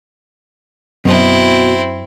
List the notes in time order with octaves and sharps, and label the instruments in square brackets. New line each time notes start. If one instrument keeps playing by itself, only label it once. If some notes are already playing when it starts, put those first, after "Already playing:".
[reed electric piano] F#2 [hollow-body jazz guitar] B2 [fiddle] C4 E4